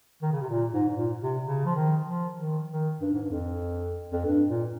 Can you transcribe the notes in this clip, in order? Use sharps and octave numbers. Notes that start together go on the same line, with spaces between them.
D#3
C#3
C3
A#2
G#2
G#2
A#2
C3
C#3
F3
D#3
F3
D#3
D#3
G2
G#2
G2
F2
F2
G2
A#2